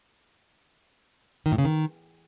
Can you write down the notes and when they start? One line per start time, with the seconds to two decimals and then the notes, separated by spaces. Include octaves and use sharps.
1.46 D#3
1.52 A2
1.58 C#3
1.65 D#3